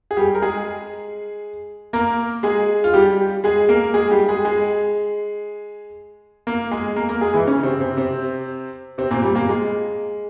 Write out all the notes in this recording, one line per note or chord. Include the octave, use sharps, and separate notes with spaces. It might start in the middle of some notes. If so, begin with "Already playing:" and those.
G#4
G3 G4
A#4
G#3 G#4
A#3 A#4
G#3 G#4
F4
G3 G4
G#3 G#4
A#3 A#4
G#3 G#4
G3 G4
G#3 G#4
G#3 G#4
A#3 A#4
G#3 G#4
A#3 A#4
A#3 A#4
G#3 G#4
E3 E4
C#3 C#4
C3 C4
C3 C4
C3 C4
C3 C4
A#2 A#3
G3
A#2 A#3
G#3